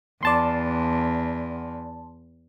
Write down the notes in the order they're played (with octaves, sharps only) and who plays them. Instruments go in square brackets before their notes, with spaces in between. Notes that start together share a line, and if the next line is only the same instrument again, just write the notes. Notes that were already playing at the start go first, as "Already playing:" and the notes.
[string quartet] E2 [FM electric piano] D5 A5 C6